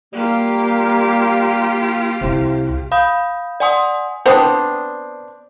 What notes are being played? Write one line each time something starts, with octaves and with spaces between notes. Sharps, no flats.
G3 A#3 F4 G4
C2 C3 A3
F5 B5 D#6 G6
D5 F#5 G#5 C6 D#6
B3 C4 D4 C5 D#6